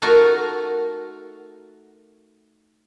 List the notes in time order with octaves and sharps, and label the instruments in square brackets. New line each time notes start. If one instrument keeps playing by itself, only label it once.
[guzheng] A3 D#4 F4 F#4 A#4